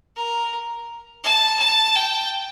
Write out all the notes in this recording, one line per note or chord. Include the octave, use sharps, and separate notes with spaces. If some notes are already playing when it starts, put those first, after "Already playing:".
A#4
A5
A5
G5